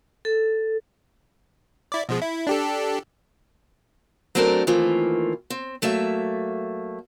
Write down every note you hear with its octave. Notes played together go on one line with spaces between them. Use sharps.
A4
E4 D5
B2 F3 G#3
E4
D4 G4 A4
F#3 A3 C4 D4 A4 A#4
D#3 E3 A3 A#3 C4 F4
C4
F#3 A3 A#3 E5